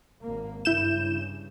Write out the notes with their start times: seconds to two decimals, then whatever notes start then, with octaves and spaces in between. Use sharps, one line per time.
0.23 G#1 G#2 A#3
0.65 G2 C#3 E4 G6 E7